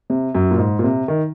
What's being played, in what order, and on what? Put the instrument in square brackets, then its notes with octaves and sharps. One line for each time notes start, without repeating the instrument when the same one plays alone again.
[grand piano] C3
F#2
A#2
G#2
A#2
C3
D#3